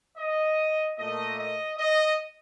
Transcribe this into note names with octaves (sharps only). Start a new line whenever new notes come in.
D#5
A#2 A3 D#5
D#5
D#5